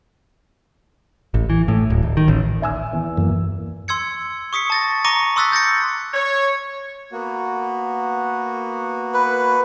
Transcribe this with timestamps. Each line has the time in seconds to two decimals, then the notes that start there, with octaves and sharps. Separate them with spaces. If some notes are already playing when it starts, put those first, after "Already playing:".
1.34 A1
1.50 E3
1.68 A2
1.90 D1
2.03 D1
2.17 D#3
2.28 A1
2.62 E5 G#5 E6
2.93 E2
3.17 F#2 E3 A#3
3.88 C6 E6 G#6 C#7
4.53 C#6 D#6 B6 C#7
4.70 A5 A6 A#6
5.04 A#5 C#6 D6 A#6 C#7 D#7
5.36 C6 D#6 E6 F#6 A6 B6
5.52 G6 A6 A#6 C#7
6.13 C#5
7.13 A#3 B3 F#4
9.14 B4